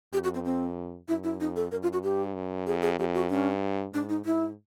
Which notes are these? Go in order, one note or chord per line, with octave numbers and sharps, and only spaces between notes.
F2 G4
F#4
C4
C4
F#2 E4
E4
F2 D#4
A4
F#2 A#4
F4
F#4
G2 G4
F#2
F2 G#4
G#4
F2 G4
F#4
G2 C#4
G#2 D4
D#4
G#2 E4